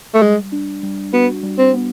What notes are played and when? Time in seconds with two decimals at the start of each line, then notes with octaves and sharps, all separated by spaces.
0.14 A3
0.22 G3 G#3
0.52 D4
0.83 G3
1.13 B3 F#4
1.43 G3
1.58 C4
1.73 B3